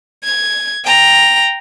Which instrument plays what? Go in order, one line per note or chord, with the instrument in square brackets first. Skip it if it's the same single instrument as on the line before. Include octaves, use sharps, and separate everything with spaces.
[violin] G#6
G5 A#5